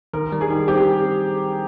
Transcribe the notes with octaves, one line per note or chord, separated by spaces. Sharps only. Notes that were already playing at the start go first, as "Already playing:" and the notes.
D#3 A#4
G3
G#4
D#3
C4 G4